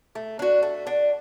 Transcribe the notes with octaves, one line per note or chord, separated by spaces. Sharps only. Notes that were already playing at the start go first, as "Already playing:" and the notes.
A3
D4 F#4
A3
D4 F#4